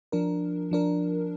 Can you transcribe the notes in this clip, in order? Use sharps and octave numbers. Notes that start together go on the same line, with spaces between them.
F3 D4 A#4
F3 D4 A#4